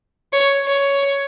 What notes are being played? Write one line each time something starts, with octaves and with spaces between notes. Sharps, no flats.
C#5
C#5